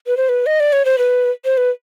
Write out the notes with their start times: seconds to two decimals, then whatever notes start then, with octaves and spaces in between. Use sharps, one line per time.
0.07 B4
0.17 C5
0.29 B4
0.46 D#5
0.60 D5
0.72 C#5
0.85 C5
0.98 B4
1.45 C5
1.57 B4